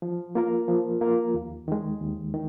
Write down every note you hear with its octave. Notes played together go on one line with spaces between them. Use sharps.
F3
A#3 F4 A#4
F3
A#3 F4 A#4
D#2
D#3 G#3
D#2
D#3